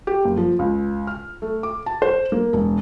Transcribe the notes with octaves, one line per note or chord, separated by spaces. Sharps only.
G4
F#1
F3
C#2
F6
A3
D6
A5
C5
A#3
E1